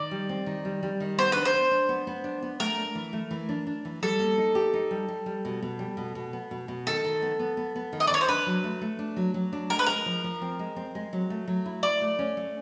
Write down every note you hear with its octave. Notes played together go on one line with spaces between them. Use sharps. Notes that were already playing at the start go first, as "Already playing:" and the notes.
Already playing: D#3 D5
G3
C4
D#3
G3
G3
D#3
B3 C5
D4 B4
C5
D4
D4
B3
B3
D4
B3
A3 A#4
D4
E3
A3
E3
D4
D4
E3
G3 A4
A#3
D#4
G4
D#4
G3
G3
G3
B2
B2
G3
B2
B2
B3
B2
B2
D#3 A4
D#3
B3
B3
B3
B3
D#3
D#5
D5
D#3 C#5
C5
D4 B4
F#3
A3
A3
D4
F#3
F#3
D4
G#3 A#4
B4
G#3 A#4
F3
F3
C4
G#3
C4
G#3
F#3
A3
F#3
E4
E4 D5
A3
C#4
A3